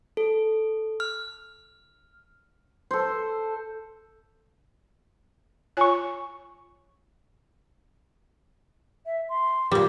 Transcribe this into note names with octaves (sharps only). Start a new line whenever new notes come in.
A4
F6
A4 C5
F4 C#5 G#5 C#6 F#6
E5
C6
A#2 G3 D6